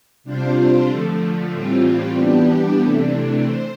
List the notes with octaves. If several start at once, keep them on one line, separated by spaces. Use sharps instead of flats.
C3 G3 D4 F4 C5
D3 F3 A3
A2 E3 G3 C4 F4
E3 G3 B3 D4 G4
C3 E3 A3 D4
C5